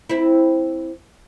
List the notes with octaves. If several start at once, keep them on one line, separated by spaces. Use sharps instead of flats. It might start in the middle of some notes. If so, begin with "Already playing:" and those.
C4 E4